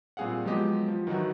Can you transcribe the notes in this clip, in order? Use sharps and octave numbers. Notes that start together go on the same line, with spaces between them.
A#2 G3 C4 G#4 F5 F#5
F3 F#3 G#3 B3 G4 D#5
F3
D#3 E3 F#3 D#4 F#4